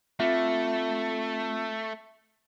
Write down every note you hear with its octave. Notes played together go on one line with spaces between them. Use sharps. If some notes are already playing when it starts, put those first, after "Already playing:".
A3 C4 F4 E5